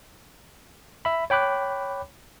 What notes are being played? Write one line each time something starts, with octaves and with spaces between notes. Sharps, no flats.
E5 B5
C#5 G5 B5 D6 F#6